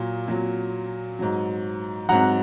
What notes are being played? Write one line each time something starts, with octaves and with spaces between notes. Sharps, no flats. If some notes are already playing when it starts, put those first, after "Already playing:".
Already playing: A#2 F#3
A#2 F#3
G#2 F#3
G#2 F#3 F#5 A#5